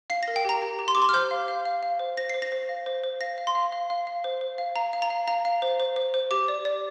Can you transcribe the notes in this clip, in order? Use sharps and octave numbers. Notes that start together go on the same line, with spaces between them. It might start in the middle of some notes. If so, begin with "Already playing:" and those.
F5 C7
A#4 A#6
G5
G4 A#5
G4
G4
C6
G4 D6
C6
F6
C5 G6
F5
F5
F5
F5
C5
C5 A#6
C5 C7
A#6
C5
F5
C5
C5
F5 A#6
F5
C6
F5
F5
F5
F5
C5
C5
F5
F5 A#5
F5
A#5
F5
F5 A#5
F5
C5
C5
C5
C5
G4 D6
D5
D5